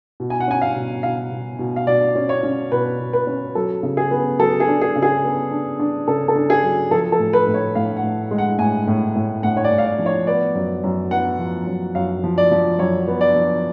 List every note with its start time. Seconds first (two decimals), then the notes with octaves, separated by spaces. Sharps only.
0.20 B2
0.30 G#5
0.40 F#5
0.48 C#4 G#5
0.62 F5
0.76 B2
1.03 B2 F5
1.32 B2
1.59 B2
1.76 F5
1.87 B2 D5
2.15 C#4
2.29 C#5
2.43 C#4
2.72 B2 B4
3.00 B2
3.13 B4
3.27 C#4
3.55 F#3 A4
3.83 C#3
3.97 G#4
4.11 B3
4.39 F#3 A4
4.60 G#4
4.68 D4
4.82 G#4
4.96 C#3
5.03 G#4
5.24 B3
5.51 D4
5.79 D4
6.07 C#3 A4
6.28 A4
6.36 D4
6.50 G#4
6.63 F#3
6.91 F3 A4
7.12 A4
7.19 A2
7.33 B4
7.48 A2
7.54 C#5
7.75 A2 F5
7.97 F#5
8.03 A2
8.31 G#3
8.38 F#5
8.59 A2 G#5
8.87 A2
9.15 A2
9.43 A2 F#5
9.57 C#5
9.64 D5
9.71 A2
9.78 F5
9.85 D5
9.99 F3
10.06 C#5
10.27 B3 D5
10.55 F#2
10.84 F#2
11.11 B3 F#5
11.39 F3
11.67 F#2
11.95 F#2 F5
12.24 F3
12.38 D5
12.51 F3
12.79 F#2 C#5
13.08 B3
13.21 D5
13.35 F3